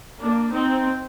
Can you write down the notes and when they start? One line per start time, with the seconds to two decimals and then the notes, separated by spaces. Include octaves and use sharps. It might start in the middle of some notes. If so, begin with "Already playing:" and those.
0.19 A#3 D4
0.52 C4 D#4